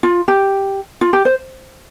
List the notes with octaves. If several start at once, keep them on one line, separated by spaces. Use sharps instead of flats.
F4
G4
F4
G4
C5